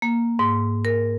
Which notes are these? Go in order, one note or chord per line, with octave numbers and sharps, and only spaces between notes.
A#3
G#2
A#4